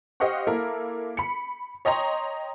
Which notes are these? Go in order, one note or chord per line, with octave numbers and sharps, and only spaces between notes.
G4 C5 D#5 F5 F#5 C#6
A#3 E4 A4 A#4
B5 C#7
C#5 D#5 G5 A#5 C6